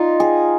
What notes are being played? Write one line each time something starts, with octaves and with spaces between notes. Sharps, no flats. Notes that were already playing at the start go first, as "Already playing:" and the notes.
Already playing: D#4 F4
G#4